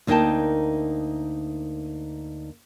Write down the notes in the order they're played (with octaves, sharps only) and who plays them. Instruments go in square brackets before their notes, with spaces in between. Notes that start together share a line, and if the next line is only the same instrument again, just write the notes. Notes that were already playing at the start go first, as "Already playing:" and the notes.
[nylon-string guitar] D2 A#3 D#4 A#4 G5 A5